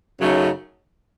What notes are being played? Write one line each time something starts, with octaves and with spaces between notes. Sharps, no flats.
F#2 C#3 F#3 A3 D#4